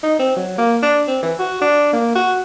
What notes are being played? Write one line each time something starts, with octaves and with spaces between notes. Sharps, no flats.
D#4
C4
F#3
A#3
D4
C4
E3
F#4
D4
A#3
F#4